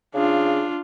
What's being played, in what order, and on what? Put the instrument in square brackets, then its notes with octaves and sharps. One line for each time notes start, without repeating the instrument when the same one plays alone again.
[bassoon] C#3 [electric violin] D4 F4